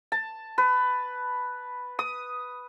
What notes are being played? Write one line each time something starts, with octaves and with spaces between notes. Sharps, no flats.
A5
B4
D#6